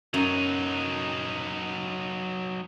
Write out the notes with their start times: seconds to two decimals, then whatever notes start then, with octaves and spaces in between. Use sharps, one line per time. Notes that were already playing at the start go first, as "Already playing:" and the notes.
0.14 F#2 F#3 D#4